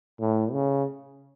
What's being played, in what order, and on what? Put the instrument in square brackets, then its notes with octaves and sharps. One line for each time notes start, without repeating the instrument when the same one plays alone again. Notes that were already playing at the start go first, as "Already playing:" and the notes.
[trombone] A2
C#3